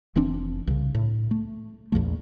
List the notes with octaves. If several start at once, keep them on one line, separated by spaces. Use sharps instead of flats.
F1 E3 C4 D4
C2 C#3
A2
A3
A#1 E2 F3 A3